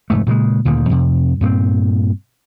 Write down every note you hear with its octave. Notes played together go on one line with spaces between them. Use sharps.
F1 G#2 A3
A#2 C#3 F3 G#3
D2 A#2 D3 D#3
F2 C3
G2 A#2 A#3 C4